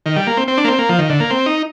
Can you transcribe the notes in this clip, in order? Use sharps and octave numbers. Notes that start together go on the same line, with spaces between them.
D#3
G3
A#3
C4
C4
D4
A#3
C4
A#3
F3
D#3
D3
A#3
C4
D#4